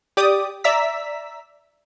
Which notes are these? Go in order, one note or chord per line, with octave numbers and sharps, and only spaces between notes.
G4 D5 D6 D#6
D5 E5 A#5 E6 B6